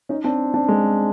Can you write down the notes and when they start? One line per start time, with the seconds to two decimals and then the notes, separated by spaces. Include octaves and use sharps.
0.09 C#4 D#4
0.24 C4 D4
0.54 C4 D4
0.69 G#3